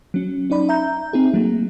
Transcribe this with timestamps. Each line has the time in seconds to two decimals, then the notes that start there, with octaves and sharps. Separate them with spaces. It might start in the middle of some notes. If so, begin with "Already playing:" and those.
0.14 F#3 C#4
0.50 C#4 D#4 D5 B5
0.69 E5 A#5 G6
1.13 C4 D#4 G#4
1.34 F#3 A3 A#3